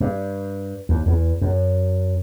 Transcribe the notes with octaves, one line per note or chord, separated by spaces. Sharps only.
G2
D#2
E2
F#2